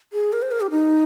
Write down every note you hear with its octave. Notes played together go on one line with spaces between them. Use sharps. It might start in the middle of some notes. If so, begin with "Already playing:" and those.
G#4
A#4
C5
A#4
G4
D#4